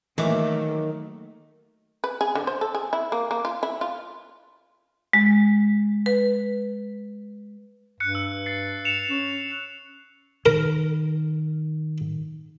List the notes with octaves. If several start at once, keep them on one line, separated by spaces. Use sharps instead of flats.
D#3 E3 F#3 A3 A#3 E5 D6
B4
G#4
D3
C5
A4
G#4
E4
A#3
A#3
F4
E4
F4
G#3
B4
G2 F#6 C#7
E6
A6 C7
C#7 E7 F7
C#4
D#3 A#4